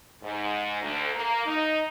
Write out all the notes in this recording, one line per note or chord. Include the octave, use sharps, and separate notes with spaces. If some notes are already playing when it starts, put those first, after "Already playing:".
G#2
D2
A#3
D#4